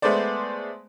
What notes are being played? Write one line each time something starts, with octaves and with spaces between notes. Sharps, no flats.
G#3 A3 B3 C5 D5